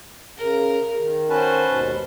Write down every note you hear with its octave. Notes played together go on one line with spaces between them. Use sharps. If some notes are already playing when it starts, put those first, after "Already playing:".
C#3 A#4
D#3
C#4 F#4 B4 C5 A5
D#2 G#2 B2